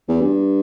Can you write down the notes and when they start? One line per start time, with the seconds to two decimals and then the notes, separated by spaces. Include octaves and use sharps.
0.09 E2
0.21 G2